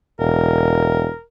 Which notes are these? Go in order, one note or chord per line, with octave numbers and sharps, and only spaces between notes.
E1 A#4